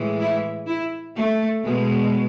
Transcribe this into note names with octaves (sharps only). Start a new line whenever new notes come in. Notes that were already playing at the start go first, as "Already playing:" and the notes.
Already playing: A2 E3 G#3
E4
E4
A3
B2 G#3